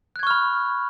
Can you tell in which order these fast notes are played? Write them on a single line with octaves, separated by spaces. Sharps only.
F#6 G#6 C#6 F6 B5